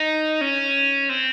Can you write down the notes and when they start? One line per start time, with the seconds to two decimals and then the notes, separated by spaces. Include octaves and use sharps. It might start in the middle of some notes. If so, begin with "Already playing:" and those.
Already playing: D#4
0.41 C#4
1.09 C4